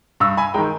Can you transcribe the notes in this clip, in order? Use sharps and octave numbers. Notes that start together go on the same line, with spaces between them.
G2 C#6 E6
G#5 B5
D#3 G#3 G5 A#5